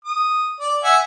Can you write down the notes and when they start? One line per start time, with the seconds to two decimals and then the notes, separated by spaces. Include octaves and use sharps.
0.05 D#6
0.60 D5
0.84 E5 F#5 G#5